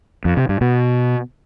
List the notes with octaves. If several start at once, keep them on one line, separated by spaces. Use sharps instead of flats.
F2
C3
G2
B2